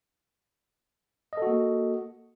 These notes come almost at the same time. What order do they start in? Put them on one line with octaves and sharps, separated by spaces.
D#5 A4 F#4 A#3